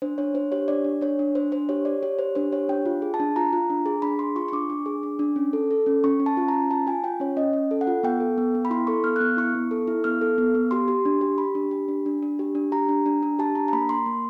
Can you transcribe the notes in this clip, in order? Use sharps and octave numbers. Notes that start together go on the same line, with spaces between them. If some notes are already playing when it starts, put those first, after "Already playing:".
D4 C5
D4 C#5
D4 C5
G4 C#5
D4 D5
D4
D4 C#5
D4
D4 C5
D4 C5
G4 C#5
G4 D5
G4 C#5
G4 C5
D4 C5
G4 C#5
D4 G5
F4
G#4
A5
D4
F4 A#5
F4
D4
G#4
D4 B5
G#4 C6
F4 C#6
C#6
D4 D6
D4
G#4
D4
D4
C#4
A4
A4
C#4
C#4 C#6
C#4
A5
F4
A#5
C#4
F4 A5
F4 G#5
F4 G5
C#4 C#5
C#4 D#5
C#4
A4
F#5
F4
B3 G5
A4
B3
B3
B5
E4 C6
A4 C#6
B3 F6
F#6
B3 F6
E4 C#6
B3
A4
E4
B3 F6
A4
B3
B3
G4 C6
G4
D4
G4
G4 B5
D4
G4
D4
D4
D4
G4
D4
G4 A#5
D4
D4
D4
G4 A5
D4 A#5
A#5
A#3 B5
A#3 C6
A#3